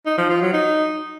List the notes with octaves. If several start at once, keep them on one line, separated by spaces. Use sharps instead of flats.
D#4
F3
F4
F#3
D#4